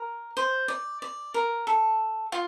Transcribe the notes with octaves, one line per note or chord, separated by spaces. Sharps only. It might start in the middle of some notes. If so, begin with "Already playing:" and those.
Already playing: A#4
C5
D5
D5
A#4
A4
F4